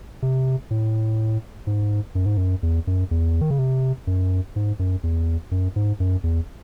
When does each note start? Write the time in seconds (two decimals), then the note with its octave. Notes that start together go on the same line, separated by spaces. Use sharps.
0.22 C3
0.71 A2
1.67 G#2
2.15 F#2
2.26 G#2
2.37 F#2
2.63 E2
2.87 F#2
3.11 E2
3.41 D#3
3.50 C#3
3.59 C3
4.07 F#2
4.56 G#2
4.79 F#2
5.03 E2
5.51 F#2
5.76 G#2
6.00 F#2
6.24 E2